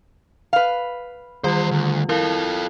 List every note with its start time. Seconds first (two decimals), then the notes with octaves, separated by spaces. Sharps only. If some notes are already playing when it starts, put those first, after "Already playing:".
0.53 B4 F5
1.44 E2 D#3 G3 F4 C5
1.71 D2
2.09 E4 F4 A4 A#4 F5